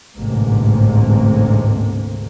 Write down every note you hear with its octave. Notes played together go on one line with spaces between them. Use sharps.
A1 D2 G#2 C3 A#3